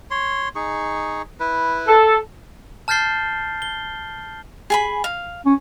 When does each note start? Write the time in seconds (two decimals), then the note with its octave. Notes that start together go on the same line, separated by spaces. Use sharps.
0.11 C#5 C6
0.56 D#4 G#4 C#6
1.40 E4 B4
1.87 A4
2.88 A5 F6 G6 A6 C7 G7
3.62 G7
4.70 G#4 G#5 B5
5.04 F5
5.46 C#4